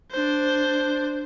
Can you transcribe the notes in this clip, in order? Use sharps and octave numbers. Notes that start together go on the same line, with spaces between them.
D4 C5